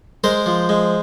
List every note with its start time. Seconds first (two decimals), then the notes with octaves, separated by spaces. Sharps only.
0.24 G#3 A#4 C5
0.46 F3
0.69 G#3